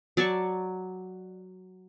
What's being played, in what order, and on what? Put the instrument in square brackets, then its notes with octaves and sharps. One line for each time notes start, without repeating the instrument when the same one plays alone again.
[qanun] F#3 D5 A5 C#6